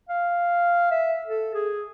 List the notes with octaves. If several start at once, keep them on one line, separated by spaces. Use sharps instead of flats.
F5
E5
A4
G#4